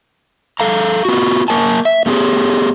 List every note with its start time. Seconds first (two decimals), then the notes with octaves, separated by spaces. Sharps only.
0.60 A4 F5 A#5
1.05 B3 F4 F#4
1.48 A#3 A#4 G#5 A5
1.85 E5
2.06 A3 B3 G4 G#4